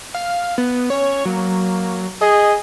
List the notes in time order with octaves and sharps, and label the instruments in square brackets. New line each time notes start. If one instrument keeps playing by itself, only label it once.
[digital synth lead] F5
B3
[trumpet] C#4 [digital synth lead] C#5
[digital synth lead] F#3 [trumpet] A#3
[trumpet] G#4 [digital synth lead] D#5